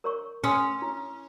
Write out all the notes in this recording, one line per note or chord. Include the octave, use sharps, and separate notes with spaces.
A#4 C#5 C#6
C#4 C6 D#6 E6
E4